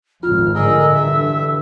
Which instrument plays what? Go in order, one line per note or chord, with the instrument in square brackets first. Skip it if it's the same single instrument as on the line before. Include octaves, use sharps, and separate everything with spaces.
[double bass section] G#1 F2 [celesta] F4 [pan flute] F6
[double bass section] A2 D3 [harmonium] G#4 A#4 D#5 [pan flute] E6
[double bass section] G2 D3 E3 [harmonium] E5